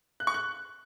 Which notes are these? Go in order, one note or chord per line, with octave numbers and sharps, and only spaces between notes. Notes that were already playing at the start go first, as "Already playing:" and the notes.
F#6
C#6
F#6